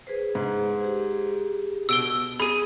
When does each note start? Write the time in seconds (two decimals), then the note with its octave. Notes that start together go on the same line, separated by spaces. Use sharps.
0.07 G#4 B4 C5
0.35 G#2
0.80 G4 G#4
1.89 B2 E6 D7 G7
2.40 G#4 B5 D#7